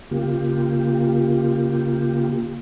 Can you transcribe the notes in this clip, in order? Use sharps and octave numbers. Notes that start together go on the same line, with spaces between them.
C#3 A#3 F4 G4